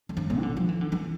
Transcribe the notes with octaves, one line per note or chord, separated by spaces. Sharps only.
F2
G2
A#2
E3
D3
F3
E3
D3
E3